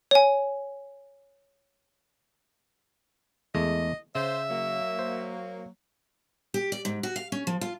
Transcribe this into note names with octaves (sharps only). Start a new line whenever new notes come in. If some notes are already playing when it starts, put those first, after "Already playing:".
C#5 G#5
E2 G#3 A3 D#5
C#3 C5 E5
F#3 A#3
C5
G4
D5
G#2
F#4
F5
C#4
F3
F4